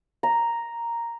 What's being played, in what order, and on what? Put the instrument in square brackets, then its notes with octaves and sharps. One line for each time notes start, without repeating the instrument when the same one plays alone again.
[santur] A#5